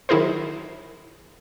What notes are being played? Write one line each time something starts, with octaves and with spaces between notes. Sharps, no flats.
D#3 F#3 E4 G#4 A#4 C5